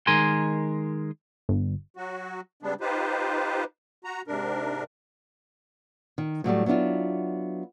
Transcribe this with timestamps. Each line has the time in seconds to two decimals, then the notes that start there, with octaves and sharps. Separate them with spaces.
0.07 D#3 G#3 A#4 G#5 C6
1.49 G1
1.97 F#3 F#4
2.63 C#3 G3 G#3 B3 D4
2.81 D#4 F4 G4 B4 C5
4.04 F#4 A#5
4.27 G#2 C3 D4 A#4
6.18 D#3
6.44 A2 F#3 G3 A3
6.66 F#3 B3 D4 E4 F4